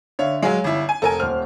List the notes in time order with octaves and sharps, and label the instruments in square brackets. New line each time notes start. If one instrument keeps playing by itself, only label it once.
[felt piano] D3 E5 F5 [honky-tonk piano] C#5
[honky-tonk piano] F#3 G#3 [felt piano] C#5 F5 G#5
[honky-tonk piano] G1 E4
G#5
[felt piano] F1 [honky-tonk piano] A4 A#4 G#5
[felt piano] D#1 C5 [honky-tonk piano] F6